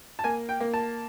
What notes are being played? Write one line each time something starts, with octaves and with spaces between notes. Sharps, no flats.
A5
A#3 G#5
G5
A#3
A5